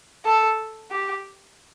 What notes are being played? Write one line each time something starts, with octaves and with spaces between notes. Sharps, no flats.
A4
G4